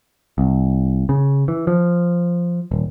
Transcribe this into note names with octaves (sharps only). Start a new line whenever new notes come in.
C2
C#3
E3
F3
D#1